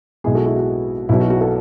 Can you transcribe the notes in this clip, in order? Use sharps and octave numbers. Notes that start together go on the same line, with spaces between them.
B1 B2 G#3 B3 E4 G#4
F#4 A4
E4 G#4
F#4
B1 B2 F#3 E4
F#4
F#4
F#4 A4